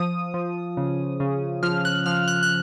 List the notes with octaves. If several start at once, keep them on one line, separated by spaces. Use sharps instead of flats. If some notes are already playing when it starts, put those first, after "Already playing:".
Already playing: F3 D#6
F3
C#3
C#3
F3 F6
F#6
F3 F6
F#6
F#6